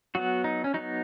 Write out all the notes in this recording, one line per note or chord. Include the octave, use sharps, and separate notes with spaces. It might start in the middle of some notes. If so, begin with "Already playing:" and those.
F#3 B3 F#4
D#4
C#4
F#3 B3 D#4